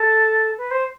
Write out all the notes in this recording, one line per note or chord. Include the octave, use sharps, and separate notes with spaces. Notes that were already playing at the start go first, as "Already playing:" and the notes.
Already playing: A4
B4
C5